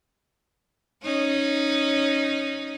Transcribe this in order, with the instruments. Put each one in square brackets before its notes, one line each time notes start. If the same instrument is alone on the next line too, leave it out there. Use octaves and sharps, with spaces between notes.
[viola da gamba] C#4 D#4